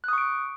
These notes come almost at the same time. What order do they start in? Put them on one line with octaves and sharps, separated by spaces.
F#6 D#6 C#6 D7